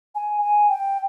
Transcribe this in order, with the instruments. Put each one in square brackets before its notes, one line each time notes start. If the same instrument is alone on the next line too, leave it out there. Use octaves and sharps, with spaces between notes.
[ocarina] G#5
G#5
G5